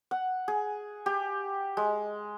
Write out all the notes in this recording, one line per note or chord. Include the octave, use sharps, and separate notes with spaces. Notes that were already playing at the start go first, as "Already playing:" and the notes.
F#5
G#4
G4
G#3